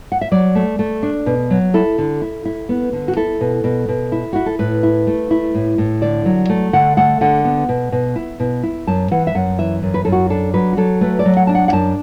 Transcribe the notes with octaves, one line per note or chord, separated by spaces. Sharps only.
F#5
E5
F#3 D5
A3
A3
D4
B2
F#3
E4 A4
D3
E4
E4
B3
D3
F#4
E4 A4
B2
B2
B2
E4
E4 F#4
A4
A2 B4
E4
A3
E4
A2
A2
D3 D5
F#3
A3
D3 F#5
A3 F#5
D3 F#5
B3
B2
B2
E4
B2
E4
F#2 A5
E3 F#5
E5
F#2 F#5
E3 E5
F#2
B4
F#2 A4
F#4
D4 A4
F#3 B4
F#4
F#3 A4
A3 B4
D5
F#3
F#5
D4 A5
F#5
F#5
F#2 A5